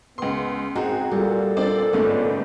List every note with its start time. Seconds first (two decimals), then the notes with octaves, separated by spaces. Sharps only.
0.18 C#2 B3 C6
0.76 G#2 C4 D#4 F#4 G#4 A#5
1.12 A#2 G3 A4
1.57 A#2 C4 D4 D5
1.93 G1 G#2 D3 A3 C#4 D4